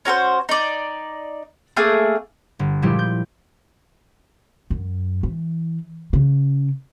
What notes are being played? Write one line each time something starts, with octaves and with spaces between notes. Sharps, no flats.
C#4 F#4 A#4 C5
D#4 D5
A3 A#3 G#4
G1
A#2 F3 G3 G#3 E4 G4
G6
F#2
E3
C#3